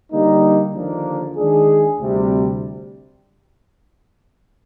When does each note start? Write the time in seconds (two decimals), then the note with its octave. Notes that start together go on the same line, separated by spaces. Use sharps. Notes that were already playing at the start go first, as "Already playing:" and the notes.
0.12 D3 G3 A#3 D#4
0.74 D#2 D3 F3 A#3 D4
1.37 D#3 G#3 D4 G#4
1.99 D2 C3 G3